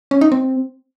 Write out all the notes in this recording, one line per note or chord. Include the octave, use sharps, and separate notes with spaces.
C#4
D#4
C4